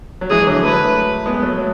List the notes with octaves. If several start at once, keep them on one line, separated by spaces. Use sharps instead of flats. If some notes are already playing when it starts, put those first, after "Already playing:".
F#3
E3 G#3 G#4
D3 F#3
F#3 A3 B4
G#3 B3
F#3 A3
F#3